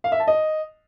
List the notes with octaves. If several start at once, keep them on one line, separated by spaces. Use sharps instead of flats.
F5
E5
A5
D#5